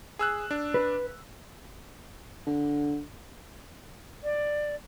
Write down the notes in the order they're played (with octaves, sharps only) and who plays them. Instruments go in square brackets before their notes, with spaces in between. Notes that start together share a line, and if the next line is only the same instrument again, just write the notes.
[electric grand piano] G#4 E6 F#6
D4
[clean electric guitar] B4
[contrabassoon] D3
[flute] D5